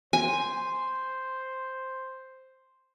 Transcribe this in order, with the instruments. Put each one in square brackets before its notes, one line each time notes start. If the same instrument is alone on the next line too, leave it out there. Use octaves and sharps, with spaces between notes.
[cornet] C5 [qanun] G#5